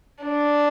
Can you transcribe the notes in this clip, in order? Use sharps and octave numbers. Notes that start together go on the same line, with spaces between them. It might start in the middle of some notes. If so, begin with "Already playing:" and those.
D4